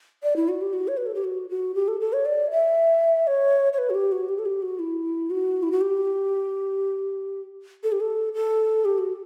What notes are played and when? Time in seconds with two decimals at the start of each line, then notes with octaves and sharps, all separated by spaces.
0.23 D5
0.36 E4
0.49 F#4
0.61 G4
0.73 F#4
0.88 C#5
0.97 B4
1.06 A4
1.15 G4
1.24 F#4
1.49 F#4
1.75 G4
1.88 A4
2.01 A4
2.13 C#5
2.25 D5
2.51 E5
3.27 C#5
3.73 C#5
3.78 B4
3.90 F#4
3.95 G4
4.12 F#4
4.29 G4
4.39 A4
4.46 G4
4.62 F#4
4.79 E4
5.30 F#4
5.63 E4
5.72 F#4
5.81 G4
7.83 A4
7.92 G4
8.01 A4
8.34 A4
8.85 G4
8.98 F#4